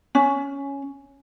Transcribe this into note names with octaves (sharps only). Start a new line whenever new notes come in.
C#4